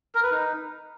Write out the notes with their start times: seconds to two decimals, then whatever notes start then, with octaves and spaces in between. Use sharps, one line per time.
0.15 A#4
0.23 B4
0.31 D#4